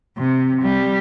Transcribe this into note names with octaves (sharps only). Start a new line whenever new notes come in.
C3
G3